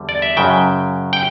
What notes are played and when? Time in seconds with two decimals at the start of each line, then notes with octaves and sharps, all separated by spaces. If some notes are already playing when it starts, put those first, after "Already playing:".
Already playing: E2 D3 G3
0.09 D5
0.22 E5
0.37 F#2 C#3 F#3 G5
1.13 G5